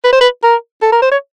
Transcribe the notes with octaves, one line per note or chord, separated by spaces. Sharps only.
B4
C5
B4
A#4
A4
A#4
C5
C#5